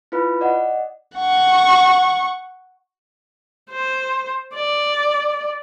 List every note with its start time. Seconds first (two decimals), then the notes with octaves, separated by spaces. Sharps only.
0.12 E4 F4 B4 B5
0.41 D5 D#5 F#5
1.19 F#5 C#6
3.71 C5
4.54 D5